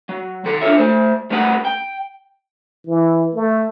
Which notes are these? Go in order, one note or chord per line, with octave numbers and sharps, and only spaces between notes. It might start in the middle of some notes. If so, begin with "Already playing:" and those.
F#3
D#3 A4
D4 F4 A4 C#5 E5
A3 C5
G3 A3 C#4 B4 E5 F#5
G5
E3
A3